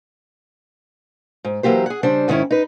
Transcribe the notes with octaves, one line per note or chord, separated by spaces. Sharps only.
G#2
E3 F#3 A#3 G4 C5
G#4 F#5
C#3 G3 D4 C5
G#2 D#3 C#4 E4
D#4 B4